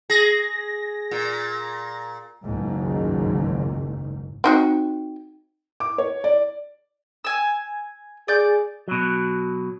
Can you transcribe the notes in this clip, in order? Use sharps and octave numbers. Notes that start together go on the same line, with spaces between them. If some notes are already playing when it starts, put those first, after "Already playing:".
G#4 A#6
A#2
F#1 C#2 G#2 D#3
C4 D#4 F#4
D6
C#5
D5
G#5 E6
G#4 D5 G6
B2 F#3